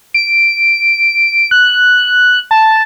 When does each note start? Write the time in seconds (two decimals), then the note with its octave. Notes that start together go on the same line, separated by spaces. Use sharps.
0.14 D7
1.51 F#6
2.51 A5